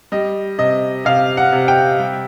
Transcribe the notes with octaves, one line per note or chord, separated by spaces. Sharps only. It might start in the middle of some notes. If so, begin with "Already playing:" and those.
G3 D#5
C3 D#5
C3 F5
F#5
C3
G5
G3